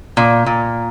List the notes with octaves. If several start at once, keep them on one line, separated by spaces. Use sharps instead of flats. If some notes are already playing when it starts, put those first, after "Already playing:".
A#2
A#2